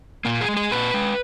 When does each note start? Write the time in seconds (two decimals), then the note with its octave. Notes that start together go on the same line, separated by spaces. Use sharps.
0.25 A#2 A#3
0.41 G#4
0.49 G#3
0.57 G#4
0.71 A#2 B4
0.94 G#3